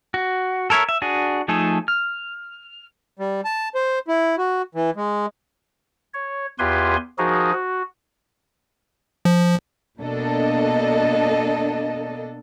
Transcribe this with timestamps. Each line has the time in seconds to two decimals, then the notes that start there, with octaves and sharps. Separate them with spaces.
0.14 F#4
0.70 A4 A#4 C#5 E5
0.89 E5
1.02 D4 F#4 G#4
1.48 F3 A3 D#4 G#4 A4
1.88 F6
3.19 G3
3.45 A5
3.75 C5
4.08 E4
4.38 F#4
4.75 E3
4.96 G#3
6.14 C#5
6.59 E2 F4 G4 B4 G#5 C6
7.18 F3 D#4 F#4 G#4 A#4
7.53 F#4
9.25 F3
10.00 B2 A#3 D4 A4 D#5